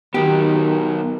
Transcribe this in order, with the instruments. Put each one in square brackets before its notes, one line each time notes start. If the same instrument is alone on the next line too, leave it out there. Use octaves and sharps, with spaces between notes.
[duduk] D#3 [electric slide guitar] B3 D#4 F#4 [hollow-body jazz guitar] G4 [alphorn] A#4